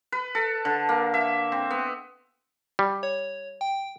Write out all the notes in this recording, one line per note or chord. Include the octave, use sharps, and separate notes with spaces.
B4
A4
D3
A#3
E5
C4
B3
G3
C#5
G5